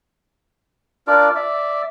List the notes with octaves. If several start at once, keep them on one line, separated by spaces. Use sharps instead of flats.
D4 F4 A#4 D5
D5 E5